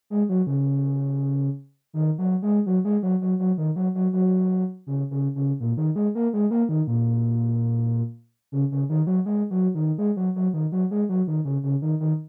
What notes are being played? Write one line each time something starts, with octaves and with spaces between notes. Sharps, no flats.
G#3
F#3
C#3
D#3
F#3
G#3
F#3
G#3
F#3
F#3
F#3
D#3
F#3
F#3
F#3
C#3
C#3
C#3
A#2
D#3
G#3
A#3
G#3
A#3
D#3
A#2
C#3
C#3
D#3
F#3
G#3
F#3
D#3
G#3
F#3
F#3
D#3
F#3
G#3
F#3
D#3
C#3
C#3
D#3
D#3